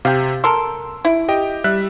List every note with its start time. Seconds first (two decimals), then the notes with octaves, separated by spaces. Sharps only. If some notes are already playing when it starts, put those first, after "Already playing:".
0.05 C3 G4 F5
0.44 A4 A#4 C6 E6
1.05 E4
1.28 G4 D#5 G5
1.64 G3 E5 F#6